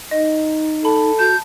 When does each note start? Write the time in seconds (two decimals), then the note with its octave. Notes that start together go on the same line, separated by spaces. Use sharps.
0.11 D#4 D#5
0.85 A4 B5
1.19 F#4 A5 G6